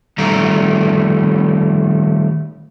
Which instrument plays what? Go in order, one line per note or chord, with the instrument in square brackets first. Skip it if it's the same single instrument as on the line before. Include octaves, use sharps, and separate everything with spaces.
[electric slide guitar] D#3 G3 A3 A#5